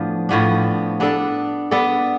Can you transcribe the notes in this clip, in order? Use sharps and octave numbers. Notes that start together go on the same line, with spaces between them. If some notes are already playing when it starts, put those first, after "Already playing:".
Already playing: A2 F3 B3 D4
A2 F3 B3 D4
B3 D4 A4 D5
B3 D4 A4 D5